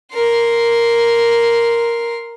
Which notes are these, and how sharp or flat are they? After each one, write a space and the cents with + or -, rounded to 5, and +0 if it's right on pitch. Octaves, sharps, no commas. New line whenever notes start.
A#4 +0 C6 +0